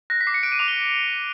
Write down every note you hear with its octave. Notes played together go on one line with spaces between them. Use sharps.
F#6 A#6
B6
D6 C7
C#7
F#6 D7
D#7
D6 F7
G7